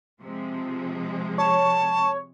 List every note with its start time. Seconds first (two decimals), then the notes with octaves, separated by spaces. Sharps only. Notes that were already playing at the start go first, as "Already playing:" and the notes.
0.21 C3 F3 G#3
1.38 C#5 A5